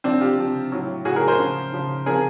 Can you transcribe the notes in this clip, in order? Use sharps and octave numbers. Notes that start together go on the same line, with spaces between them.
C3 F3 C4 D4
F4 G4
C3 F3
A2 F#3
A2 F#3 F#4 G#4
G#4 A#4
A#4 C5
C#3 F3
C#3 F3
C3 F3 G#4 A#4